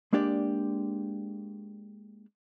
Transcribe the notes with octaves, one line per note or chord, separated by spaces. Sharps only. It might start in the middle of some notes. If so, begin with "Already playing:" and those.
G#3 A#3 D4 G4 D5